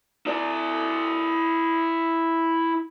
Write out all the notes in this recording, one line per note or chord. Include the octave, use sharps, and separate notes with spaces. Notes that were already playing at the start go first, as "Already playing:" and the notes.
E4 D5